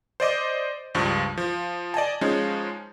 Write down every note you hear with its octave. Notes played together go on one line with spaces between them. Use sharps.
C5 D5 D#5 D6
C#2 G2 F3 C#6
F3
D5 D#5 G#5 A5
F3 G#3 C#4 D#4